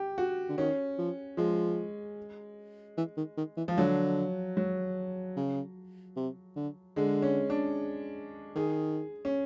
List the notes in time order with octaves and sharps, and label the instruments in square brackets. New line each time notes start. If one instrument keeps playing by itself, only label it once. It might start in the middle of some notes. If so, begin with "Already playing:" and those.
Already playing: [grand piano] G4
F#4
[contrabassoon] D3
[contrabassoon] D#3 [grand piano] C#4
[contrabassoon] F3
[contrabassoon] F3 [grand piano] G#3
[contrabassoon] E3
D#3
D#3
E3
[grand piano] F3
[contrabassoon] D3 [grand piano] F#3
[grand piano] F#3
[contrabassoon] C#3
C3
D3
[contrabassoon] D3 [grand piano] G#3
[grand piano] C#4
D4
[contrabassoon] D#3 [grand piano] G#4
[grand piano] C#4